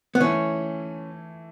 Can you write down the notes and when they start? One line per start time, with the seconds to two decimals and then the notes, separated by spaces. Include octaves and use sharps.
0.15 B3
0.20 E3 A3 C#4 E4